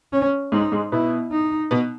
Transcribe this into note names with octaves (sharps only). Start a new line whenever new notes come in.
C#4
G#2 G#3 D#4
G#2 G#3
B2 B3 E4
D#4
B2 B3